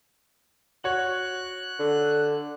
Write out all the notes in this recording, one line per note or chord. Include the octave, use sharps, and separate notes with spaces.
F#4 C#5 F#6
D3